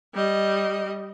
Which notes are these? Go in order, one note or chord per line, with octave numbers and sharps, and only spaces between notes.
G3 D#5